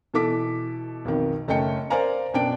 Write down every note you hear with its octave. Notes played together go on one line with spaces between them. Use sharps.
B2 E3 A4 D6 B6
B1 F2 D#3
F#1 A3 C#4 D#5 G5 C#7
A#4 C5 D5 F5 G#5 A#5
F#2 B2 D4 D5 G5 D7